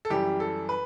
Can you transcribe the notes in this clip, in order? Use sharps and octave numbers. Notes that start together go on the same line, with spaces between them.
A4
F#2 E3 G3 G4
A4
B4